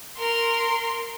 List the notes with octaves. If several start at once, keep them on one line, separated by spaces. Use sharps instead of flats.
A#4 C6